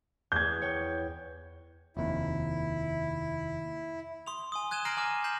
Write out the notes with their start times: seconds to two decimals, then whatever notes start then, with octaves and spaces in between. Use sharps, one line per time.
0.32 E2 G6 G#6
0.62 C#5 G5
1.97 F1 D#2 E4
4.26 C6 D#6 F7
4.52 G#5 C6 D#6
4.71 D#6 F#6 G#6 D#7 E7 G7
4.85 A#5 F6 A#6 C7 D7 F#7
4.97 G#5 D6 F6 E7
5.24 G6 A#6 C7 E7 F#7